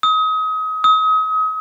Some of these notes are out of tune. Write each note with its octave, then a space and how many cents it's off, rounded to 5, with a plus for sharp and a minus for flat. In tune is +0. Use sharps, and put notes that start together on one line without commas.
D#6 +30
D#6 +35